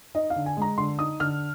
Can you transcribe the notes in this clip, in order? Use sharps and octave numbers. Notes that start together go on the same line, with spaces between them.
D#4 D#5
F5
D3
G#5
G#3 A#5
D3 C6
D#4 D#6
D3 F6